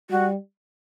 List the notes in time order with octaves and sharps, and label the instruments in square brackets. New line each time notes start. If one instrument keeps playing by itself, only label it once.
[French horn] G3 [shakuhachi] F#4